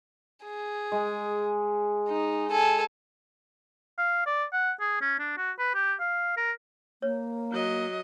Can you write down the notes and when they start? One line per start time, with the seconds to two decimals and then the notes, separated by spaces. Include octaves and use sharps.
0.45 G#4
0.92 G#3
2.09 D#4
2.52 A4 G#5
3.98 F5
4.26 D5
4.53 F#5
4.80 G#4
5.01 C#4
5.19 D4
5.37 F#4
5.59 B4
5.75 G4
6.00 F5
6.37 A#4
7.02 A#3 C#5
7.51 F#3 D#5